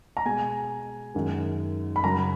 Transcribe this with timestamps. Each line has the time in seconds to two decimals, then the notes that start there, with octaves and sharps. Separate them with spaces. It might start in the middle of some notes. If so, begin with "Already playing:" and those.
0.17 A#5
0.25 B2 G#3 G#5
1.14 F#2 D#3 G#3
1.96 B5
2.03 F#2 C#3 F#3 A#5